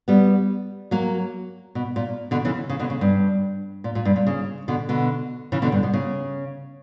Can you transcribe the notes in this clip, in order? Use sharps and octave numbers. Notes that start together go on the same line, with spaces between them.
G3 B3
F#3 A#3
B2
A#2
B2 D3
C#3 E3
C#3
B2 D3
C#3
G2
A#2
A#2
G2
A#2
C#3
B2 D3
B2 D3
C#3 E3
B2 D3
G2
B2
C#3